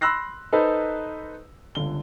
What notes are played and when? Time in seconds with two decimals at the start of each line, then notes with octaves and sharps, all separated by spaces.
0.01 B5 C6 E6 F#6 A#6 C7
0.53 D#4 A4 B4 C5 D#5
1.75 G1 C#2 D3 G7